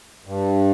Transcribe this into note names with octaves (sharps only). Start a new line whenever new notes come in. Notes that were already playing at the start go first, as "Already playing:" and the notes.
G2